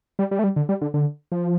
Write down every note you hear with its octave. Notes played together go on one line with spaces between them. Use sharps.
G3
G3
A3
G3
D3
G3
D3
D3
F3